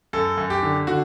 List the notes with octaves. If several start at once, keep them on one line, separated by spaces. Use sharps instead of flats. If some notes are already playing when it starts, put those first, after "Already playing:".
F#2 A4
F#2
G4
D3
D3 F#4